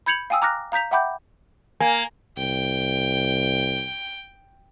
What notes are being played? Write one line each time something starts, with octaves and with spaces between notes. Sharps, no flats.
B5 G6 G#6 C#7 F7 F#7
F5 G5 G#5 D#6 E6
A#5 D6 F6 F#6 A#6
F5 A#5 G6 B6 F7
E5 F#5 G5 B5 D6 G6
A#3 G#5
C2 G5